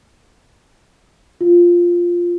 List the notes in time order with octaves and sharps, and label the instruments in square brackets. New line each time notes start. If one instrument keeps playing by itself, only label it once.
[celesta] F4